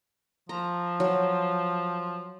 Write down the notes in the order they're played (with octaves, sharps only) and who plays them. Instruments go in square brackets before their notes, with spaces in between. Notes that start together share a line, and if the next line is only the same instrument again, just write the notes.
[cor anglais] F3 [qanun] A#5
[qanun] F#3